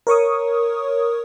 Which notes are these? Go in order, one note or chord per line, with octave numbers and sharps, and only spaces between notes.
A#4 C#5 C#6 D#6